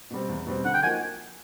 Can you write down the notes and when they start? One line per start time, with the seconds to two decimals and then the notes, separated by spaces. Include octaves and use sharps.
0.11 B2 G3 C4
0.29 E2
0.47 B2 G3 C4
0.64 D3 F#5
0.74 G5
0.83 F3 A#3 D#4 F#4 G#5